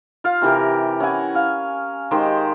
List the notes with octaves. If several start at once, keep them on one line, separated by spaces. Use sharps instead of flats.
F4 F5
C3 E3 G4 A#4
C#4 E4 F#5 G#5
F5
D#3 G#3 G4 C5